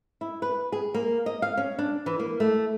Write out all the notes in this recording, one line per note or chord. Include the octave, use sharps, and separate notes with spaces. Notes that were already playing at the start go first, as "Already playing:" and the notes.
E4
B4
G#4
A#3
D#5
F5
C#4
D4
E3
A#3
A3